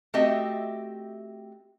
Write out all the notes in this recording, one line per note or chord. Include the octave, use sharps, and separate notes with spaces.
A3 C4 F#4 G4 D#5 E5